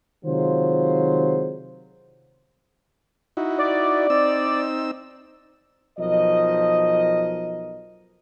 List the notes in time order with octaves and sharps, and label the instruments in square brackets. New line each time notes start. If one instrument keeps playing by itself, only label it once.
[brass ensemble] C3 D#3 F#3 G#3 F4 C5
[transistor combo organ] D#4 E4 F#4
[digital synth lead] D5
[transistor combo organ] C4 D#4 E6
[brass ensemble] B1 F3 A#4 D#5